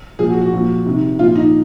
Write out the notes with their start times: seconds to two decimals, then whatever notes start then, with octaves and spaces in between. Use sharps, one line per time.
0.19 A#2 F3 G#4
0.30 F#4
0.41 F#4
0.53 A#2 F3
0.86 C3 D#3
1.19 A#2 F4
1.22 F3
1.35 D#4